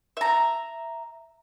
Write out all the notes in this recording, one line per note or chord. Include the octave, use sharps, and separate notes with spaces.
E5 A#5